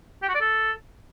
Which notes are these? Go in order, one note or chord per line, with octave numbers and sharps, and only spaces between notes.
G4
F#4
D5
A4